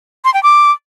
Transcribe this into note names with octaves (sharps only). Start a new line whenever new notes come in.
C6
G5
D6